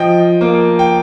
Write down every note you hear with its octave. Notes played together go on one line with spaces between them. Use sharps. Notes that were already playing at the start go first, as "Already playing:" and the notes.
Already playing: F3 D#5 G5
A#3
G5